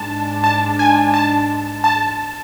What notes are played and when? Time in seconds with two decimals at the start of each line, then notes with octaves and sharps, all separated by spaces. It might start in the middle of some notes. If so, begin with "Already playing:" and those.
Already playing: G#2 G#3 D4 A5
0.44 A5
0.79 G#5
1.14 A5
1.84 A5